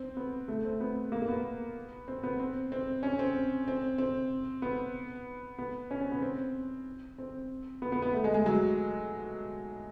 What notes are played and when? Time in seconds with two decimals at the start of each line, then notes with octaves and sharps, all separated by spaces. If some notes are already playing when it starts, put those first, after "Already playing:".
Already playing: C4
0.17 B3
0.48 A3
0.65 C4
0.81 B3
1.12 A#3
1.22 A#3
1.28 B3
2.08 C4
2.23 B3
2.39 C4
2.72 C4
3.03 C#4
3.19 C4
3.68 C4
3.98 C4
4.62 B3
5.58 B3
5.91 C#4
6.01 C4
6.12 B3
6.22 C4
7.18 C4
7.82 B3
7.92 B3
8.02 B3
8.13 A3
8.24 G#3
8.34 G#3
8.46 F#3